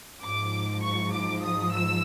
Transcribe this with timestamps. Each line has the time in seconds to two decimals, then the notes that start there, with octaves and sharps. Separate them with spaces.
0.22 G#2 F3 D6
0.83 C#6
1.13 D6
1.43 D#6
1.73 E6